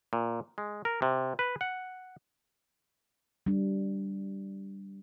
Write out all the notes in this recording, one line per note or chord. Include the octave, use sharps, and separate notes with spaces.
A#2
G#3
A#4
C3
B4
F#5
G3 D4